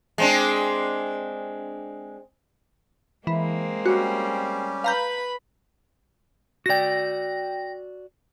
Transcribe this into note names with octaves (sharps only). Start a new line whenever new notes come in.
G#3 C4 D4
E3 G#3 A#3 C4
G3 C#4 F#4 G4
B4 F5 A#5 B5 G6
F#4 D5 G5 A#6